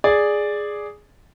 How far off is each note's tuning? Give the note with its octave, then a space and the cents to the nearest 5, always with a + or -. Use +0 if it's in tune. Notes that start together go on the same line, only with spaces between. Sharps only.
G#4 +0 D5 +0